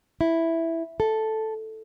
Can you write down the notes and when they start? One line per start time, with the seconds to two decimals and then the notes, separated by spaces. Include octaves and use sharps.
0.21 E4
1.00 A4